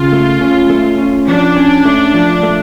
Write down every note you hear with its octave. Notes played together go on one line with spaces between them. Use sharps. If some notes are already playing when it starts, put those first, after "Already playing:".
Already playing: C#3 F4
A3
C#4
A3
C#4
F3 D4
C#4
A3
F3
A3